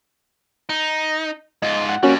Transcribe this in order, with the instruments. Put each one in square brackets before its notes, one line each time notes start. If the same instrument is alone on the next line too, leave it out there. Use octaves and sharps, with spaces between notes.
[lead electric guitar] D#4
[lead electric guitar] G#2 F4 [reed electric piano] D#5
[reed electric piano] F#5
[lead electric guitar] F2 G3 [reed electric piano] A#3 C#4 F#4